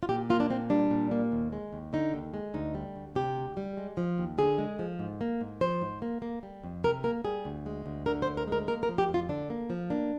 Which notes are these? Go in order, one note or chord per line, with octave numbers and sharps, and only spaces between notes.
F4
A#2 G4
A#3 F4
D4
A#2 C4
G3 D4
A#2
A#3
D#2
G#3
D#2
D3 D#4
D#2
G#3
D2 D#4
G3
D2
C3 G4
D2
G3
G#3
F3
D#2
D3 G#4
G#3
F3
G#2
A#3
G#2
F3 C5
G#2
A#3
A#3
G3
F2
C3 A#4
A#3 A#4
G3 G#4
D2
G#3
D2
D3 A#4
C5
D2
A#4
G#3 A#4
A#3 A#4
A#4
F3
G4
F2
F4
D3 D4
A#3
F3
A#3 D4